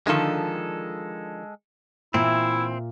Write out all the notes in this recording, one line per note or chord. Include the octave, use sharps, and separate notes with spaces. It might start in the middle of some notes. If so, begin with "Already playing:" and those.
D3 D#3 F3 G#3 A4
A#2 E3 C4 E4